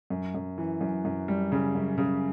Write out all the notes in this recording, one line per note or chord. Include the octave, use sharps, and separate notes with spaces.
F#2
F#2
E3
F#2
F#2
G3
C#3
F#2
C#3